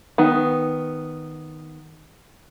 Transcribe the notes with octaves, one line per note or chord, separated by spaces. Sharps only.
D#3 B3